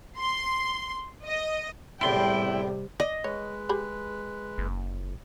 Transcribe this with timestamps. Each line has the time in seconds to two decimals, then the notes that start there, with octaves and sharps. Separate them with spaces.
0.19 C6
1.26 D#5
2.01 E2 A2 C3 G3 E4 G5 G#5 C6
3.00 D5 D#5
3.24 G#3 B4 C#5
3.69 G4 G#4 B5
4.58 F#1